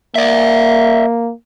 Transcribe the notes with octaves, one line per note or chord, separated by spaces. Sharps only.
A#3 D5 E5